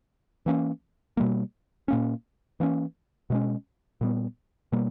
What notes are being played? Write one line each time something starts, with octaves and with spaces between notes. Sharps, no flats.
E3 A#3 C#4
B2 G3 A#3
A#2 A#3 C#4
E3 A#3 C#4
B2 G#3 C#4
A#2 G3 B3
B2 G3 A#3